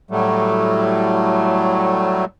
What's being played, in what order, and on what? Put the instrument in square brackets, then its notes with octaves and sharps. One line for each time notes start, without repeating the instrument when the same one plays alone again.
[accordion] A2 F#3 G3 A3